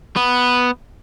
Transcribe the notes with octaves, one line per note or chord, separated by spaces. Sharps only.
B3